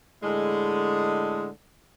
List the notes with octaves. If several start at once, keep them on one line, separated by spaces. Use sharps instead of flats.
A2 D3 G#3